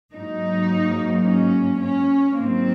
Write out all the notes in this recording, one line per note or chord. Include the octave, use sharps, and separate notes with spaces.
G#2 F#3 A#3 D#4
C#4
C#4
G#2 D#3 F#3 A#3 C4